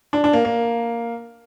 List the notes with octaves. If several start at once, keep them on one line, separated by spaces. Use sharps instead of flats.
D4
D4
A#3
A#3